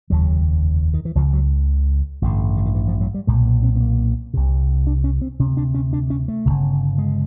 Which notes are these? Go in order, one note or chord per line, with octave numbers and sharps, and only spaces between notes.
F1 D#2 C#3 F#3
D#3
E3
C#2 C#3 F3
F#3
A1 G2 D3
D3
D#3
E3
F3
F#3
G3
B1 A#2 G#3
A#3
C4
B3
A#3
C2 C3
D4
C#4
C4
D2 C3 C#4
D4
C#4
D4
C#4
A3
G1 F#2 C#3
G#3